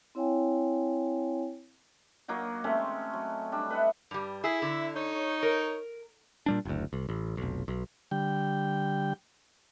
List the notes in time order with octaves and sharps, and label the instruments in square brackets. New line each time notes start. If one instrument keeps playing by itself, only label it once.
[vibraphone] C4 E4 C#5 F5 G5 G#5
[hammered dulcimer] F#3 A#3 D#4 F#4
G#3 A3 C4 C#4
F#3
G3 D4
B4 D#5 E5 F#5
[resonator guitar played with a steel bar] G2 G3
[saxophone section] E4 E5 [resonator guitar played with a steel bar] G#4
[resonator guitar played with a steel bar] D3
[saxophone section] D#4 C#5
[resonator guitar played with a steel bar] A#4
[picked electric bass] A#2 G3 D4
F#1 D2
C2
A1
F1 B1
B1
[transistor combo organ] D3 G3 G5